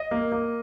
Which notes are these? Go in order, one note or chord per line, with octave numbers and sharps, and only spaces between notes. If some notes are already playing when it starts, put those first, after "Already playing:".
Already playing: D#5
A#3
A#3